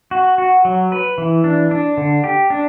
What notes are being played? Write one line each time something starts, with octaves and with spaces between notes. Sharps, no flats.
F#4
F#4
F#3
B4
E3
D4
D4
D3
G4
D4